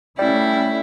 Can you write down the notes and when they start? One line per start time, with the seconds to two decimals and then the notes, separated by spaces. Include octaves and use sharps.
0.19 G3 A3 C#4 E4